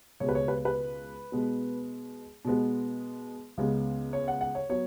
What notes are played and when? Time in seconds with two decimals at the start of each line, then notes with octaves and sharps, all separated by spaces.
0.20 C#2 B2 G#3 C#5
0.29 B4
0.35 C#5
0.48 B4
0.65 B4
1.32 B2 G#3 B3
2.45 B2 G#3 B3
3.57 C#2 C#3 G#3 B3
4.13 C#5
4.28 F#5
4.41 F#5
4.55 C#5
4.69 F#3 B3 C#5